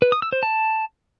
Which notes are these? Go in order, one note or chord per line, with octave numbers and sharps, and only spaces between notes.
B4
D#6
E6
C5
A5